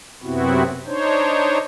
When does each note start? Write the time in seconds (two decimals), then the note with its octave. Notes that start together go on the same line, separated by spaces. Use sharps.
0.23 F#2 C3 B3 C4 E4 F#4
0.86 D4 D#4 C5 C#5